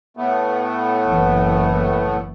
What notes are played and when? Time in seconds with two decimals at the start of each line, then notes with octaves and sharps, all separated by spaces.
0.17 A2 A3 B3
1.08 F#1 E3